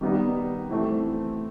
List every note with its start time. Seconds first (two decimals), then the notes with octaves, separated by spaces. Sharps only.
0.01 D#3 G3 B3 D#4
0.71 E3 A3 C4 E4